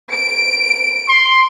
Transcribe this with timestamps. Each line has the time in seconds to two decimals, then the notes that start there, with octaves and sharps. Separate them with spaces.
0.13 D7
1.09 C6